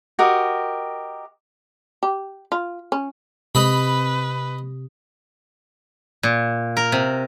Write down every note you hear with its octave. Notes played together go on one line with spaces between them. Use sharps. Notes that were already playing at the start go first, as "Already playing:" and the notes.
F#4 G4 A#4 D#5
G4
F4
C#4
C3 B4 D#5 B5
A#2
A#4
C3